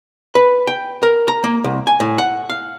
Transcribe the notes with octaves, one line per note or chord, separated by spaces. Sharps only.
B4
G5
A#4
A#5
A#3
C2
G#5
A2
F#5
F5